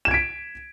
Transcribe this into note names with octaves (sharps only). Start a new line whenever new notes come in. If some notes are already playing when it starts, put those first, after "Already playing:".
G#6 B6 D7 E7